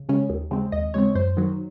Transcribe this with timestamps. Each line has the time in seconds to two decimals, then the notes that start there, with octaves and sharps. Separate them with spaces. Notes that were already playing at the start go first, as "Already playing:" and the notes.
Already playing: C#2
0.09 C#3 G#3 C#4
0.30 D#2
0.51 C#3 G#3 C4
0.72 D#2 D#5
0.94 C#3 G#3 C4 C#5
1.15 F#2 C5
1.37 D#3 F#3